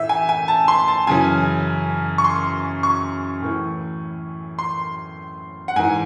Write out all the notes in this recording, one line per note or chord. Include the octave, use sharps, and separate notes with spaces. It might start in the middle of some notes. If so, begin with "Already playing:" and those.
Already playing: A2 E3 E5
G#5
G#5
A5
C6
A5
F#2 C#3 E3 G#5
C#6
C6
C#6
A2 E3
C6
F#5
G#2 E3 G#5